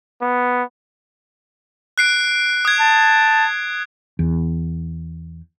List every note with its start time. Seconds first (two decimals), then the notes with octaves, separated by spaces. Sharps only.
0.21 B3
1.98 F#6 C7 D7
2.65 D#6 G#6
2.80 A5
4.19 E2